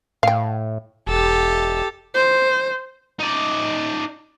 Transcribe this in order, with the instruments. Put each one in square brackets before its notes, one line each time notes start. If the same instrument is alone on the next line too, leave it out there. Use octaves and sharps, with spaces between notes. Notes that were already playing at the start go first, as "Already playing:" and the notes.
[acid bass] A2 [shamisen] F5 G5
[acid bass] E1 [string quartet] G4 A4
[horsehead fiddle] C5
[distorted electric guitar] D#4 D5